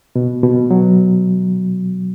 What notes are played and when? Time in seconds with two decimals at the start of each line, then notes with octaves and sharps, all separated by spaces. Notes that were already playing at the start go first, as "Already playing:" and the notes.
0.16 B2
0.43 B2
0.71 F#3